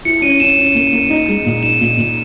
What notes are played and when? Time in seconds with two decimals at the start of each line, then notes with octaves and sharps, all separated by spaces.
0.05 E4 C#7
0.22 C#4 D#7
0.40 C#4 E7
0.57 C#4
0.75 A#3
0.93 A#3
1.10 D#4
1.28 G#3
1.46 A#2
1.63 D#4 E7
1.81 A#2
1.97 A#2